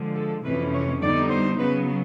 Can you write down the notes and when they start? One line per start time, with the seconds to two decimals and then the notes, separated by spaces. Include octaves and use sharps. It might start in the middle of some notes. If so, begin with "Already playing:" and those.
Already playing: D3 F3 G#3
0.15 A4
0.44 F2 C3 E3 A3 C#4 B4
0.73 C#5
1.01 D3 G3 B3 D#4 D5
1.30 C5
1.58 C#3 F#3 B3 B4